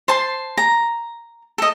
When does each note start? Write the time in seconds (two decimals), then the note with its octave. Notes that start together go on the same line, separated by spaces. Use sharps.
0.08 C5 A5 C6
0.57 A#5
1.58 A4 D#5